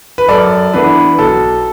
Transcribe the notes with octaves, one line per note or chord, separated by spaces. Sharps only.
B4
F#2 A4 D5
E3 B3 D4 B4
B1 A4